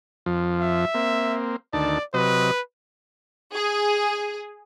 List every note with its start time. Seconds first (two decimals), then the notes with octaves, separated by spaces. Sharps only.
0.26 F2 F3
0.61 E5
0.94 A#3 C4
1.73 D2 D#3 D5 A5
2.14 C3 F#3 B4 D#5
3.54 G#4